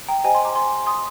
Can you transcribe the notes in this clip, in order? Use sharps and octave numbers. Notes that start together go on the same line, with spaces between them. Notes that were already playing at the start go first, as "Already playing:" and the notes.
G5 A#5
G4 C5 D#5 G5 G#5
G#5 C6
A#5 D6
G#5 C6
C6 D#6